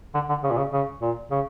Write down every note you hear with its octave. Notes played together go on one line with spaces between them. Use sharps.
D3
D3
C#3
A#2
C#3
C#3
A#2
C#3